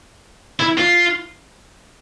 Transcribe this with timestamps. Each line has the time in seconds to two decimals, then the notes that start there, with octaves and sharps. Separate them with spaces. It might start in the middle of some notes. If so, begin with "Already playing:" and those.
0.60 E4
0.78 F4